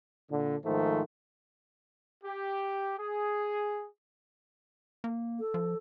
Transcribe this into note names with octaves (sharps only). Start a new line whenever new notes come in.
A#2 D3
G#2 D#3 F3 A3
G4
G#4
A#3
A4
F3